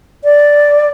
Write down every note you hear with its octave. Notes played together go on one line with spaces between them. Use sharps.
D5